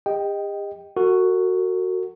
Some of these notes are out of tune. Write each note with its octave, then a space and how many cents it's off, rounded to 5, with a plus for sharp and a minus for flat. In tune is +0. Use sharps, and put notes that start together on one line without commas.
G4 +45 D#5 +0 G5 +0
F#4 +0 A#4 -45